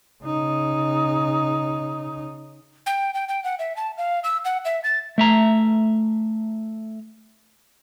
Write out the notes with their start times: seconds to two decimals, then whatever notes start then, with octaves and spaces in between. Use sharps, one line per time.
0.24 C#3 D#4
2.86 G5
3.14 G5
3.29 G5
3.44 F#5
3.59 E5
3.77 A5
3.98 F5
4.24 E6
4.45 F#5
4.65 E5
4.84 A6
5.18 A3 E5 A#5